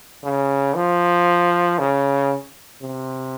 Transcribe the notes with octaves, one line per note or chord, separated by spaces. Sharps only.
C#3
F3
C#3
C3